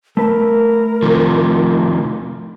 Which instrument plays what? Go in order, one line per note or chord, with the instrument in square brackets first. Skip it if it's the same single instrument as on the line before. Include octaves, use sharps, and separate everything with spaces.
[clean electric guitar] A3 B4 [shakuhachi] A#4
[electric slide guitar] C3 D#3 F3